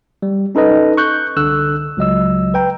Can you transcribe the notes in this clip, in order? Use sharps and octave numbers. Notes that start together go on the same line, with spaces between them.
G3
C#4 D#4 A4 B4 D#5
C#6 F#6 G6
C2 D3 E6 F#6
C#2 F#3 D#5 E6
B4 G5 A#5